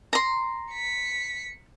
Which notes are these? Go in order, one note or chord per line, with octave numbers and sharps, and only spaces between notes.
A#5 C6
B6 C#7